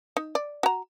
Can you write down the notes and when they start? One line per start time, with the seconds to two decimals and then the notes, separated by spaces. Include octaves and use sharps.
0.17 D#4
0.35 D5
0.63 F#4 A#5